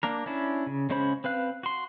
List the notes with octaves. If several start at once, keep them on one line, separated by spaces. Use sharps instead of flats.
A#3 D4 A#4
C#4 D4 E4
C#3
C#3 G#3 C#4 C5 B5
C4 B4 F5 F#6
F#4 C6